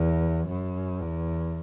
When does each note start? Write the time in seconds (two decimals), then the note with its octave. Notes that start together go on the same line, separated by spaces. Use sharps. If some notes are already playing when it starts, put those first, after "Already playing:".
Already playing: E2
0.48 F#2
1.01 E2